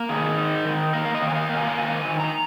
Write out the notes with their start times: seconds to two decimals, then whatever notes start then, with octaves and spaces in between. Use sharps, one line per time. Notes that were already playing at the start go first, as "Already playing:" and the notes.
Already playing: A#3
0.09 D#3 G#4
0.38 D#4
0.65 D#3
0.93 A#3 A#4
1.05 F5
1.15 D#5
1.22 D#3
1.29 G#5
1.35 F5
1.49 A#3
1.57 G#5
1.67 F5
1.78 D#3 G#5
2.05 D#3
2.20 A#5